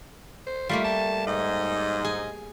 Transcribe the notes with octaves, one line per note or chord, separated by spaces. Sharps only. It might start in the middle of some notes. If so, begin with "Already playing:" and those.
C5
G3 A3 A#3 F4
A5
G#2 D#5
G#4